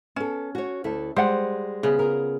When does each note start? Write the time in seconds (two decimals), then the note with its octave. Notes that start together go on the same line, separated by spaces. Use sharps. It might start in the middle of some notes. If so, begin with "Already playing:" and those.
0.16 B3 C#4 A4
0.55 F#4 C#5
0.84 D2 E4 A4
1.16 G3 G#3 C5 F#5
1.83 C#3 B3
1.99 F4 G#4 A#4